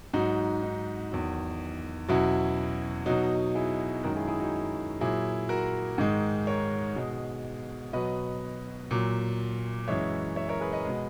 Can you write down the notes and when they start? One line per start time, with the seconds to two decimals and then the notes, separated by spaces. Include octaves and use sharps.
0.13 G#2 F#3 D#4 F#4
0.62 D#4
1.12 E2 D#3 F#3
2.08 E2 B2 F#3 C#4 E4
3.06 B2 F#3 D#4 F#4
3.55 E4 G#4
4.03 F#2 D#3 G#3 F#4 A#4
4.16 E4 G#4
4.27 E4 G#4
4.40 D#4 F#4
5.01 A#2 F#3 E4 G#4
5.49 F#4 A#4
5.98 G#2 D#3 G#3
6.47 A#4 C#5
6.96 B2 G#3
7.93 B2 F#3 B4 D#5
8.91 A#2 F#3
9.88 F#2 E3 G#3 C#5 E5
10.36 C#5 E5
10.49 A#4 C#5
10.60 G#4 B4
10.73 B4 D#5
10.85 B2 G#3